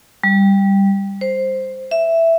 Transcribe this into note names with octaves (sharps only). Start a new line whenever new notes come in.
G3
C5
E5